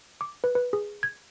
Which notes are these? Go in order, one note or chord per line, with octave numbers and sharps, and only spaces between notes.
D6
B4
B4
G#4
G#6